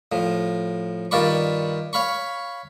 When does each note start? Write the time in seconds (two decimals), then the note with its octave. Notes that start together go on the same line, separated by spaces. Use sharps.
0.12 A2 F3
1.11 G2 D#3 F4 D5 B5 C#6
1.93 C#5 F5 B5 C#6